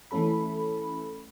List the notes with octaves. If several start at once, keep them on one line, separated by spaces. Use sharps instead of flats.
E3 A3 C#4 A4 B5